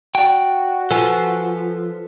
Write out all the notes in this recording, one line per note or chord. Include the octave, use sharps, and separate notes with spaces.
F#4 D5 G5
F3 A4 B4 G#5